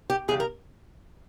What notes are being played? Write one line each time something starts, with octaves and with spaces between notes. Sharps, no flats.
G4
E2 C#3 G3 G#4
A#4